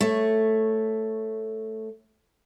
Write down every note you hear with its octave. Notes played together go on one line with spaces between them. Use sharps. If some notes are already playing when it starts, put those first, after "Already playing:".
A3 C#5